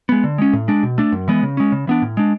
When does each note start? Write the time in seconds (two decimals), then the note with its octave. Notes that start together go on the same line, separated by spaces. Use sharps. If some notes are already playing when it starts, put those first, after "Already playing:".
0.09 G#3 B3
0.24 D3
0.38 G#3 C#4
0.53 A2
0.68 G#3 D4
0.83 B2
0.98 A3 D4
1.12 F#2
1.28 E3 G#3 B3
1.43 C#3
1.57 G#3 C#4
1.72 C#3
1.87 E3 B3 D4
2.02 A2
2.17 G#3 D4